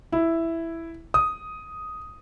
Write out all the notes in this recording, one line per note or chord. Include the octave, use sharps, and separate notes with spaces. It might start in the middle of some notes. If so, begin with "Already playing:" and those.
E4
D#6